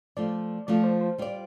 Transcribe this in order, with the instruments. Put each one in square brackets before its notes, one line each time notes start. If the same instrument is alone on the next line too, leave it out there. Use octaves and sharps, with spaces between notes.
[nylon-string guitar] F3 A3 F4 [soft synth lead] D5
[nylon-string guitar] F3 A3 F4 [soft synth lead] D5
[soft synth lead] C5
C5
[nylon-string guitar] G3 F4 D5